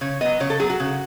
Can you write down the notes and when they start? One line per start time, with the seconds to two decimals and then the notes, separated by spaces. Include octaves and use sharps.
0.01 C#3 C#5
0.21 F#3 B3 D#5
0.40 C#3 C#5
0.50 A4
0.59 F#3 G#4
0.63 B3
0.70 F#4
0.80 C#3